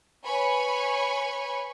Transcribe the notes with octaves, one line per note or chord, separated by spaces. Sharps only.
B4 C#5 G#5 B5 C#6